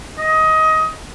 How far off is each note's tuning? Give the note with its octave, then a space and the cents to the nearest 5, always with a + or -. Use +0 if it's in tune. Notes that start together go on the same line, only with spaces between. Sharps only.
D#5 +20